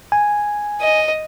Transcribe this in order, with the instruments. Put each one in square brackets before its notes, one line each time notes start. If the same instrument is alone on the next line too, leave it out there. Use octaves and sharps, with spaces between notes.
[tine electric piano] G#5
[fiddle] D#5